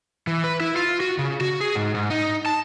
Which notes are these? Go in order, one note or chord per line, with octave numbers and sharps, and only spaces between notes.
E3
B4
E4
F4
F#4
C#3
F#4
G#4
G#2
G#2
D#4
A5